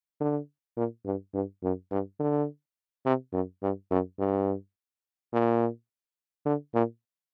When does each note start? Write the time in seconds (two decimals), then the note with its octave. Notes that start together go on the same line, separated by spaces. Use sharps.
0.20 D3
0.77 A#2
1.06 G2
1.34 G2
1.63 F#2
1.91 G2
2.20 D3
3.06 C3
3.33 F#2
3.62 G2
3.91 F#2
4.19 G2
5.33 A#2
6.46 D3
6.74 A#2